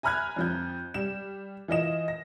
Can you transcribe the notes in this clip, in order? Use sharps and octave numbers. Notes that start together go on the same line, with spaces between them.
G#5 A#5 B5 F6 F#6 G#6
F2 F3 G6
G3 E7
E3 F4 D#5 E7
A#6